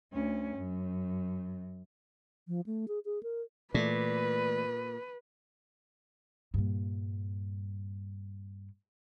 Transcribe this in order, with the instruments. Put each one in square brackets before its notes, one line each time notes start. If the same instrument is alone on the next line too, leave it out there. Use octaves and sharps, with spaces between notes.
[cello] D2 C#4
F#2
[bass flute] F3
A3
G#4
G#4
A#4
[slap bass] A#2 [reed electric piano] E3 A3 D5 [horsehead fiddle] B4
[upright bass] G2 A#2